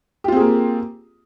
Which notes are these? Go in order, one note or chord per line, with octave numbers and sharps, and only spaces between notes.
A#3 C4 F4 G4 G#4